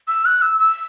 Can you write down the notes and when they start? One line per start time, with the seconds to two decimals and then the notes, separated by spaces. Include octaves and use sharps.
0.08 E6
0.25 F#6
0.42 E6
0.59 E6